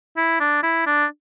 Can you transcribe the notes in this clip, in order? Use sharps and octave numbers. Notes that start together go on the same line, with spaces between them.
E4
D4
E4
D4